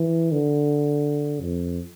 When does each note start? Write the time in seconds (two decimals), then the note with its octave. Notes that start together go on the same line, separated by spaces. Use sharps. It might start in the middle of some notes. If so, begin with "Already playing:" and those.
Already playing: E3
0.32 D3
1.41 F2